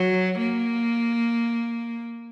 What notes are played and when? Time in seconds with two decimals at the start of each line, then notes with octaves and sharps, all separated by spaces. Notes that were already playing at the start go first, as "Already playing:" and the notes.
Already playing: F#3
0.38 A#3